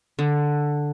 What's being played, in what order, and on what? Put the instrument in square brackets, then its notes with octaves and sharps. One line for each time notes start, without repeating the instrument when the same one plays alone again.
[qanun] D3